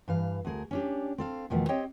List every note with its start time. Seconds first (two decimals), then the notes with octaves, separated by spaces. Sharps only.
0.08 G2 E3 F5
0.45 D2 A3 G#4 A#4
0.71 C#4 D4 G4
1.18 C4 A4 F5
1.50 E2 B2 D#3 F3 A3
1.69 C4 G4 C#5 D#5 G5